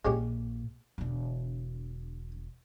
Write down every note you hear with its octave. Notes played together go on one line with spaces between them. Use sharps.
A#1 A#2 G#3 C#4 G4
E1 D3